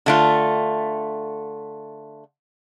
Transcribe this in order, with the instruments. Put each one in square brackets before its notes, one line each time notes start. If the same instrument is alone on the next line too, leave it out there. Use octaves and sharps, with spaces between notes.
[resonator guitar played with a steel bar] D3 A3 F4